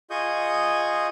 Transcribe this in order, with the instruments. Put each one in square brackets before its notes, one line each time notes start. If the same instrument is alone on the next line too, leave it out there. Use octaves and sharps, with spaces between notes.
[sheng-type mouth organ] F4 G#4 D#5 C#6 D#6 G6